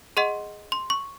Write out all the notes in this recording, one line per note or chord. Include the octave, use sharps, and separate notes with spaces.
G#4 D#5 F#5 C6
C6
C#6